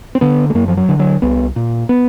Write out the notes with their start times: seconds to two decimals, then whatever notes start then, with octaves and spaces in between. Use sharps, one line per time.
0.15 C4
0.21 D3 B3
0.50 A3
0.55 F#2 A#3
0.68 F3
0.77 F#3
0.89 D3
0.99 F#3
1.22 C2 B3
1.56 A#2
1.89 B3